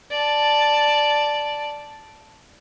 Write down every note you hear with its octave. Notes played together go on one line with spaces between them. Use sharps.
D5 A5